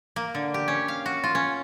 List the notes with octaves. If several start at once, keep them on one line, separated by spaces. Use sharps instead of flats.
A#3
D3
G4
C#4
F5
F#4
F4
C#4